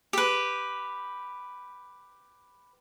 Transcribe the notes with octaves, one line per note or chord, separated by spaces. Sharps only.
G4 B4